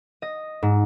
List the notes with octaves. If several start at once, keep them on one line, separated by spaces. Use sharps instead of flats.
D#5
G#2